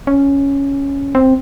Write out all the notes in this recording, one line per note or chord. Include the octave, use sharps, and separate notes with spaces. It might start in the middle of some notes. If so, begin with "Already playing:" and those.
C#4
C4